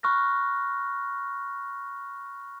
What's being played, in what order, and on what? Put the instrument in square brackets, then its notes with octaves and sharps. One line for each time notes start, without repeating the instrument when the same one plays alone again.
[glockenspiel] B5 C#6 F6 F#6 A#6